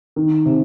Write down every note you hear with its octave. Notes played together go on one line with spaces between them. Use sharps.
D#3
C3